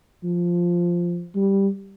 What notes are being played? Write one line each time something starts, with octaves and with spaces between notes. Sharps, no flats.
F3
G3